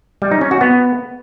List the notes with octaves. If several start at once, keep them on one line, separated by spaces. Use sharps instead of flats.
G3
D#4
C#4
F#4
B3